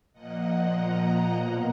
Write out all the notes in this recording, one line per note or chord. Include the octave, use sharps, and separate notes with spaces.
A#2 F3 A#3 D#5 F#5
F#5 A#5
B2 A#3